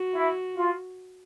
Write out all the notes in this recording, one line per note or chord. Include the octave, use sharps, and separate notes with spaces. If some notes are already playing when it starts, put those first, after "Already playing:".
Already playing: F#4
E4
F4